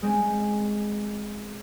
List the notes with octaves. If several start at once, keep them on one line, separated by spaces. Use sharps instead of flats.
G#3 C4 C#4